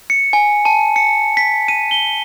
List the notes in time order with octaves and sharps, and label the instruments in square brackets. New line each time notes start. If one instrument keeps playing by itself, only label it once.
[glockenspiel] C#7
G#5
A5
C#7
B6
D#7
G7